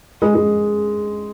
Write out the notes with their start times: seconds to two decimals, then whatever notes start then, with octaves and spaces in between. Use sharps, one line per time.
0.22 G#3
0.35 G#3